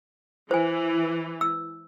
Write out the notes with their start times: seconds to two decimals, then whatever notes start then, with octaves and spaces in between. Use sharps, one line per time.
0.51 E3 C5 G#5
1.41 E6